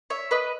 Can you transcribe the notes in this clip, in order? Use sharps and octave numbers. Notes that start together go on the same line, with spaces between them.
C#5 E5
B4 D#5